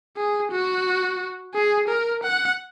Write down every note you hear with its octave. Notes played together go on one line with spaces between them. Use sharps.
G#4
F#4
G#4
A#4
F#5